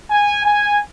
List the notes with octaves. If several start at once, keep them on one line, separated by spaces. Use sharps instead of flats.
G#5
G#5